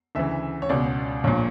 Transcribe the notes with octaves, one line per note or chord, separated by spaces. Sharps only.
D2 C#3 E3 E5
C#5
C#2 B2 D5
A#1 A#2 C#5